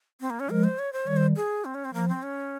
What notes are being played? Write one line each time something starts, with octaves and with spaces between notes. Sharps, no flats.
C4
A#3
C#4
F3 G#3 A#4
C5
C#5
C5
D#3 G3 C#5
C5
G#4
C4
C#4
C4
F3 A#3
C4
C#4